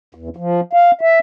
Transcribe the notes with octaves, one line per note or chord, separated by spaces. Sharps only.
E2
F3
F5
E5